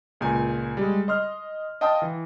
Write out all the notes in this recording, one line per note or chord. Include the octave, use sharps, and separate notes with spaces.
C#2 A#2 G#5
G3 G#3
D#5 C6 F6
D#5 F5 G5 A5 C6 D#6
E3